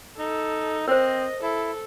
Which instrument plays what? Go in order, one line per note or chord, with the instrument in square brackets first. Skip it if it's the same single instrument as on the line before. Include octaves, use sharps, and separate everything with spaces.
[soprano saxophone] D#4 [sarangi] A4
[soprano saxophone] C4 [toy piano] A#4 C5 [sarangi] D#5
[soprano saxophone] E4 [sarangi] A4